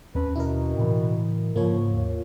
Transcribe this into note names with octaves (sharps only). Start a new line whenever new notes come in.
D#2 C4 C#4 B4
B2 E4 A#4
A2 C#3 E3
G#2 C#3 F3 A#3 F4 C#5
D#2